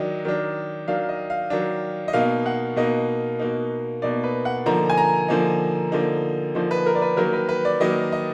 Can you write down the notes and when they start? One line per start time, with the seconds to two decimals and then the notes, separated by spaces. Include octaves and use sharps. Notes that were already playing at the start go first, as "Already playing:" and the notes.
Already playing: D#3 F#3 D4 D#5
0.25 D#3 F#3 D4
0.88 D#3 F#3 D4 F5
1.09 D#5
1.30 F5
1.50 D#3 F#3 D4
2.08 D#5
2.13 B2 A#3 D#4 F5
2.46 F#5
2.76 B2 A#3 D#4 D#5
3.39 B2 A#3 D#4
4.02 B2 A#3 D#4 D5
4.23 B4
4.45 F#5
4.66 D3 F3 A#3 D#4 A#5
4.90 G#5
4.98 A#5
5.28 D3 F3 A#3 D#4
5.92 D3 F3 A#3 D#4
6.55 D3 F3 A#3 D#4
6.71 B4
6.86 A#4
6.95 D5
7.02 B4
7.17 D#3 F#3 A#3 A#4
7.33 B4
7.49 B4
7.65 D5
7.80 D#3 F#3 A#3 D#5
8.12 D#5